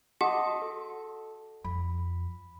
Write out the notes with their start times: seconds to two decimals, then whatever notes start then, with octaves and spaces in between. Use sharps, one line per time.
0.21 F#4 D#5 F#5 A5 C6 D6 D#6
0.62 A4
1.64 F2 B5